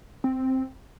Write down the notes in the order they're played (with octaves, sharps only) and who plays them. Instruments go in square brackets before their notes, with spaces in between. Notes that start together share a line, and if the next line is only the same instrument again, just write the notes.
[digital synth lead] C4